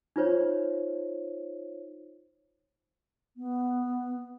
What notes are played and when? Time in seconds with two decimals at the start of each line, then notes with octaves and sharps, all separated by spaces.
0.16 D#4 F4 C5 C#5
3.37 B3